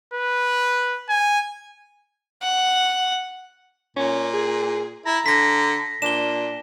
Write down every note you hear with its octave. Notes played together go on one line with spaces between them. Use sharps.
B4
G#5
F#5
A#2 C#4
G#4
E4 A#5
D3 A#6 B6
A#2 D4 E7 G7